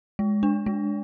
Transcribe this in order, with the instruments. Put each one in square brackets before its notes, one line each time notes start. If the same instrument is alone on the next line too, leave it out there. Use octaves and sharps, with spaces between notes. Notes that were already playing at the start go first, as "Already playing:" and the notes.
[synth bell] G#3
D4
G#3